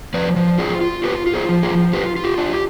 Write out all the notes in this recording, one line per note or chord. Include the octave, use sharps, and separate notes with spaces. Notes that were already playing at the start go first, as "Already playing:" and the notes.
F3 B4 D5
F3
F4 G#4 C5
F4
F4 G4 B4
F4
G#4 C5
F3
F4 G#4
F3
F4 G4 B4
F4
G4
D4
G4